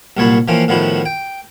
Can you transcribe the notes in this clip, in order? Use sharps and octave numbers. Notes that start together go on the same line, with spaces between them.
C2 A#2 F#3 C#5 A5 B5
E3 F3 A#3 C4 C#4
A2 D#3 F3 B3 E4 F#4
G5